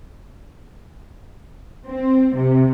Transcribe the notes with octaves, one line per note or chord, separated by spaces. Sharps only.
C4
C3